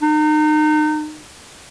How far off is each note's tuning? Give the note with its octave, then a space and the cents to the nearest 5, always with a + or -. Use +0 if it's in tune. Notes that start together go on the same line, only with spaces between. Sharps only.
D#4 -30